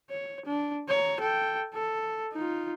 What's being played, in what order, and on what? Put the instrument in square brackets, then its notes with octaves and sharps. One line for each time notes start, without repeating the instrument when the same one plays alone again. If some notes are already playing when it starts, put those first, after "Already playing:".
[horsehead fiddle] C#5
D4
C#5 A#5
A4 G5
A4
D#4 F4